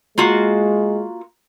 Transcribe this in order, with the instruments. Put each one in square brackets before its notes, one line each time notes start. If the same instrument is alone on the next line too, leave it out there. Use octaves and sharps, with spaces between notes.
[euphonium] G#3 [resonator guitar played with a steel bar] A#3 F4 F#4